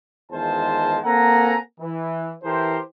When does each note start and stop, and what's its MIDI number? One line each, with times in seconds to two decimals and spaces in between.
0.31 0.99 40
0.31 0.99 51
0.31 0.99 56
0.31 0.99 65
0.31 0.99 72
0.31 0.99 81
1.04 1.56 58
1.04 1.56 60
1.04 1.56 69
1.04 1.56 78
1.04 1.56 80
1.04 1.56 82
1.80 2.31 52
2.43 2.78 52
2.43 2.78 64
2.43 2.78 67
2.43 2.78 69
2.43 2.78 70
2.43 2.78 72